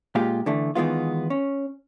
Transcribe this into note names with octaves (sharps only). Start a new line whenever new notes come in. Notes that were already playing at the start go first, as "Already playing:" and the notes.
A#2 G#3 F4 G4
D3 E3 A3
D#3 E3 G#3 B3 F4
C#4